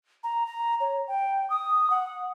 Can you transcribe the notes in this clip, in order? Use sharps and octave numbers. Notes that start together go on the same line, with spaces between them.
A#5
A#5
C#5
G5
D#6
F#5